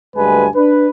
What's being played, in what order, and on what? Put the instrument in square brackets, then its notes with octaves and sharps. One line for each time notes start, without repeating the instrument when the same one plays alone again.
[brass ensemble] D2 G2 G#3 B4 G#5
D4 B4